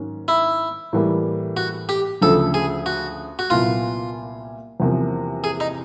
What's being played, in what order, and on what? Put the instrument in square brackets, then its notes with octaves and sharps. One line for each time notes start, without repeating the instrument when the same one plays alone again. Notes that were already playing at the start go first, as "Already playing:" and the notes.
Already playing: [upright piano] G#2 D#3 F#3 A#3 C#4
[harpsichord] E4
[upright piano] A2 E3 G3 A#3
[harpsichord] F#4
G4
[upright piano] D2 C#3 F3 [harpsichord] A4
[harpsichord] G#4
F#4
F#4
[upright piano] C2 A#2 F#3 B3 E4 [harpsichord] F4
[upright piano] E2 C3 F3 A#3
[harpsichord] G#4
D#4